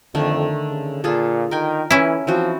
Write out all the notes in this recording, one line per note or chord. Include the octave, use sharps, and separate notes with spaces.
F2 D3 D#3 A3
C#3
A#2 F4 G#4 A4
D#3 A#4 G5 G#5
E3 C#4 E4
E3 F3 C4 F#4